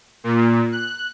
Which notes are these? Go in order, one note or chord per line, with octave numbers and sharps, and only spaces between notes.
A#2
F#6